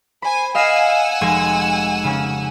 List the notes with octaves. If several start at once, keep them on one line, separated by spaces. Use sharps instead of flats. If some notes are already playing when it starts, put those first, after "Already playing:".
C5 G#5 B5
D#5 F5 F#5 G#5 E6 C7
F1 G#3 G#6
C#3 C#4